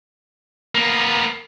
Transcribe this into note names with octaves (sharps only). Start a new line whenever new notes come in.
A#3 B3